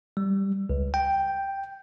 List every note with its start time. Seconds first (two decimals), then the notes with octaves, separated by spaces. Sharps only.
0.17 G3
0.70 C#2
0.94 G5